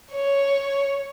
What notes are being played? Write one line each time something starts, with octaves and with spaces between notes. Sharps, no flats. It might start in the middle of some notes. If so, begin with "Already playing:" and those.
C#5